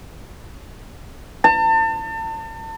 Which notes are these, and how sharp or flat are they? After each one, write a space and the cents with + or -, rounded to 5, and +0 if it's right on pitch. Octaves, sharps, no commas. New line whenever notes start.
A5 +35